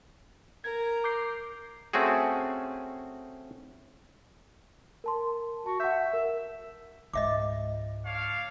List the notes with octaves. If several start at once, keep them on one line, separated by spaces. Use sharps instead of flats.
A#4 G#6
D6 G6 C7
A3 C4 C#4 F#4 G#4
A#4 A5 C6
F#4 A5
E5 F#5 G6
A#4
C#2 G#2 D#5 E5 D6
D4 C#5 F5